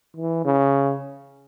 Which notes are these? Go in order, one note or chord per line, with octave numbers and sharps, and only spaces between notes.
E3
C#3